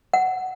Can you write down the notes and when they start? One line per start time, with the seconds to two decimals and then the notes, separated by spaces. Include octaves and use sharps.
0.14 F#5